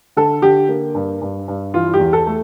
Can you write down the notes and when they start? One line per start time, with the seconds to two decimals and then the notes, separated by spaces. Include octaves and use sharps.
0.17 D3 A4
0.42 D3 G4
0.69 A#3
0.95 G2
1.21 G2
1.48 G2
1.74 E3 F4
1.94 G4
1.99 E2
2.13 A4
2.27 A3